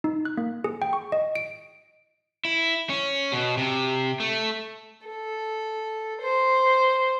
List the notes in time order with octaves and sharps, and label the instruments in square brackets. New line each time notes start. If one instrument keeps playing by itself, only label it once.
[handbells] D#4
F#6
A#3
G#4
G5
C#6
D#5
D7
[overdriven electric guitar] E4
C#4
B2
C3
A3
[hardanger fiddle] A4
C5